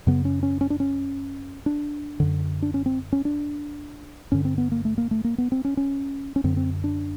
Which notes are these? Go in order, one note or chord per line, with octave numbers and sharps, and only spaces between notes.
F#2 C#3 B3
C#4
C#4
C#4
D4
C#4
D4
F#2 D3
D4
C#4
C4
C#4
D4
G2 D3 C#4
C4
B3
A#3
A3
A#3
A3
A#3
B3
C4
C#4
C#4
C#4
F#2 D3 C4
C4
D4